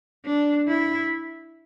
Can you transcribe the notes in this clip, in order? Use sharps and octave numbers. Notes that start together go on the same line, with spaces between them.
D4
E4